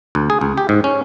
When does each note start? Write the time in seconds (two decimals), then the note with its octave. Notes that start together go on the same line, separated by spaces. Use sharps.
0.15 D2
0.30 G#4
0.41 C#2
0.58 G4
0.69 G#2
0.84 C#4